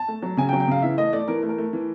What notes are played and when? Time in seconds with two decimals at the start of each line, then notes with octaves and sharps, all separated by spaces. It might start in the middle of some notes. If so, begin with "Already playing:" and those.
Already playing: A5
0.08 A3
0.22 F#3
0.37 C#3 G#5
0.49 G5
0.53 F#3
0.60 G5
0.68 C#3 F5
0.82 E3 E5
0.97 A3 D#5
1.13 A3 D5
1.28 E3 A#4
1.43 A3
1.49 A#4
1.58 A3
1.73 E3